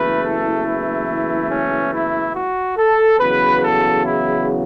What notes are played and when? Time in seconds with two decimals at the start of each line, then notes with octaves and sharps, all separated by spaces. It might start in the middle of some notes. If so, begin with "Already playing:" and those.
Already playing: F#1 E2 E3 A3 B4
0.23 A4
0.66 E4
1.51 C#4
1.92 E4
2.35 F#4
2.77 A4
3.19 E2 C#3 F#3 B4
3.61 A4
4.04 E4